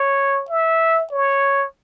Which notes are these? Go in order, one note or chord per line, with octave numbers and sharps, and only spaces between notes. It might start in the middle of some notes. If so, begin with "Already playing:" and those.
Already playing: C#5
E5
C#5